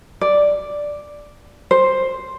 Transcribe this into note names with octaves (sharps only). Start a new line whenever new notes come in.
D5
C5